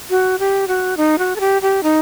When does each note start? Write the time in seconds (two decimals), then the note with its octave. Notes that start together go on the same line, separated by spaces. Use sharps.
0.10 F#4
0.39 G4
0.68 F#4
0.97 D#4
1.19 F#4
1.36 A4
1.40 G4
1.62 G4
1.83 D#4